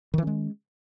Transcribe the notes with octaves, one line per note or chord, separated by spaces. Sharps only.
D#3 E3 G#3 C#4